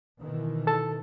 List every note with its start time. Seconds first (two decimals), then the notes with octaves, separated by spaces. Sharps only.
0.19 B2 D#3 E3
0.67 A4 A5